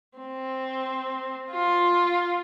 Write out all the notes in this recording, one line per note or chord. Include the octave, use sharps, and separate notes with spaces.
C4
F4